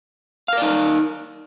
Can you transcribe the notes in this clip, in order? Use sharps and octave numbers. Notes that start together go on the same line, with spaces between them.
D#4 A#4 D5 F5